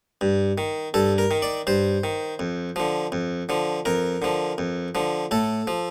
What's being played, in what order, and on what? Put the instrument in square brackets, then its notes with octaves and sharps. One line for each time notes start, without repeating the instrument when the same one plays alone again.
[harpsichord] G2
D#3
G2 A4
A#4
D#3
D5
G2 C5
D#3
F2
D3 F3
F2
D3 F3
F2 A#4
D3 F3
F2
D3 F3
A2 A4
F3